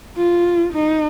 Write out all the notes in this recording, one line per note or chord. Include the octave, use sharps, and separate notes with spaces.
F4
D#4